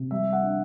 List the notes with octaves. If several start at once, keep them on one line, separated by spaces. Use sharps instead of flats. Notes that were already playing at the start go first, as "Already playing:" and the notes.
Already playing: C3
G3 E5
F#5
D4